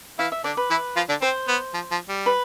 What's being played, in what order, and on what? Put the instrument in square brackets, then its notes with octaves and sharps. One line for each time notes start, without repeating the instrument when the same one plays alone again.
[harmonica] E3 E4 [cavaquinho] F5
[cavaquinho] E5
[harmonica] D3 D4 [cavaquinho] D5
[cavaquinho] B4
[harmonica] E3 E4
F3 F4
D3 D4
[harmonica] C4 [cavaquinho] C5
[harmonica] B3
F3
F3
G3
[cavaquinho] B4